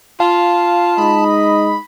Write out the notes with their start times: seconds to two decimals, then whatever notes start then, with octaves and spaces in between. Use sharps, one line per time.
0.20 F4 F5 A5
0.98 G#3 D#4 D#5 B5